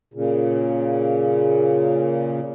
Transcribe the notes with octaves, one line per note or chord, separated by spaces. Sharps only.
A#2 C#3